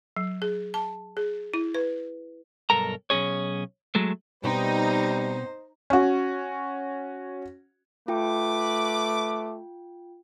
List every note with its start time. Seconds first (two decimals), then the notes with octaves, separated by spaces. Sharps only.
0.16 F#3
0.42 G#4
0.74 A5
1.17 G#4
1.54 E4
1.75 B4
2.70 B1 G2 A4 A#4 A#5
3.10 B1 E2 C#4 G#4 C#5
3.95 F#3 G#3 A3
4.43 B2 G3 C4 D#4 C5 G5
5.90 C#4 F#4
8.08 A3 F4 B4 G5 D6